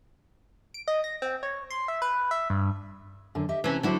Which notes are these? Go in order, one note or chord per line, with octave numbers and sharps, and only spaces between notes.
D7
D#5
A#6
C4
C#5
C6
E5
B4
E5
G2
F#2 D3
G4 D#5 E5
C3 E3 C#4
D3 F#3 E4 F#4 C5